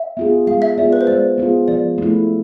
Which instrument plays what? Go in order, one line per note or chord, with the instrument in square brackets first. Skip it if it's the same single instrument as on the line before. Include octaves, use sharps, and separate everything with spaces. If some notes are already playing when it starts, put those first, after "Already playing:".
Already playing: [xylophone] E5
[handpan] B3 F4 G#4
[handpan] G#3 [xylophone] F5
[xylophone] E5
[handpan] B3 F4 G#4 [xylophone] D5
[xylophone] B4
C5
[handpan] G#3 [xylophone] D5
[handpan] B3 F4 G#4
[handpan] F3 [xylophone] D5
[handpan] A3 E4